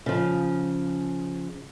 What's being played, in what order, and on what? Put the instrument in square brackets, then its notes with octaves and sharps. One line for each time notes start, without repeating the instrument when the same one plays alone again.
[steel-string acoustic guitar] C#3 F3